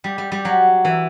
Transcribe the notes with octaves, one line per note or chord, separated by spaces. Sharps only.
G3
G3
G3
F#3
E3